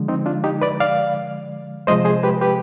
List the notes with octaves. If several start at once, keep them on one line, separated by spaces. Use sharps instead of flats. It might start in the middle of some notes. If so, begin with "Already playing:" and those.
Already playing: D3 F3 G#3
C4 D#4
D4 F4
D#4 G4
B4 D5
D5 F5
C3 F3 G#3 C5 D#5
G#4 C5
G4 B4
G4 B4